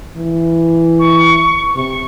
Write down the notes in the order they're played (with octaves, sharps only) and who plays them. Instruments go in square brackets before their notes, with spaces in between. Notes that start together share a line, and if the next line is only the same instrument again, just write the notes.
[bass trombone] E3
[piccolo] C#6
[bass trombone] C3 [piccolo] C#6